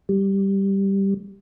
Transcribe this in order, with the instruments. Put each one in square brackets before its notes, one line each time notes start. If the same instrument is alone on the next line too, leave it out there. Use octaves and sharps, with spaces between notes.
[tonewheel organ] G3